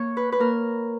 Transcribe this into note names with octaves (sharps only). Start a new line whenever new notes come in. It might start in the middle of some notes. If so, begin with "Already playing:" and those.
Already playing: A#3 C#5
B4
B4
A#3 A#4